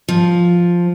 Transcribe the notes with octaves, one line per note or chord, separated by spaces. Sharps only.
F3